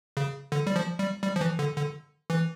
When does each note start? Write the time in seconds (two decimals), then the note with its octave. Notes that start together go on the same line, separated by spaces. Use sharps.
0.17 C#3
0.52 D3
0.67 G3
0.76 F3
0.99 G3
1.23 G3
1.36 F3
1.41 E3
1.59 D3
1.76 D3
2.30 E3